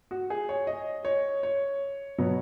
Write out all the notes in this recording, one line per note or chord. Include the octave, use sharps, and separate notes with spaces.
F#4
G#4
C#5
D#5
C#5
C#5
B2 F#3 B3 C#5